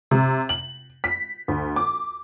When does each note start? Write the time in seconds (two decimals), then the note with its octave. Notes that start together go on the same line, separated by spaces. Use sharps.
0.11 C3
0.49 F#7
1.04 B6
1.48 D2
1.76 D6